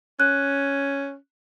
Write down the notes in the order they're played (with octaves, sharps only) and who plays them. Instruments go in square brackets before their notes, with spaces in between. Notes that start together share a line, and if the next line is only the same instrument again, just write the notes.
[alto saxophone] C#4 [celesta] F#6